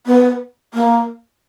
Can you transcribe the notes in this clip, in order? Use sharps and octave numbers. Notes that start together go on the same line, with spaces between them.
B3
A#3